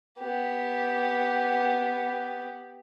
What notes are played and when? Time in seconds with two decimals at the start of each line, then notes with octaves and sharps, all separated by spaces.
0.20 B3 G4